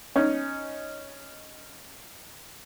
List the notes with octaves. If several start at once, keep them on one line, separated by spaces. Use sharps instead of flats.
C#4 D#4